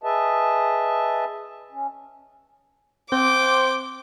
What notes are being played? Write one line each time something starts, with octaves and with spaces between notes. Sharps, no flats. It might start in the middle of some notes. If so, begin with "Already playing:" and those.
G#4 B4 D#5 E5 A5
C#4
C4 C5 G5 D6